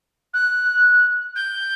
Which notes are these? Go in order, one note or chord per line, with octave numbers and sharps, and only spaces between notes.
F#6
G6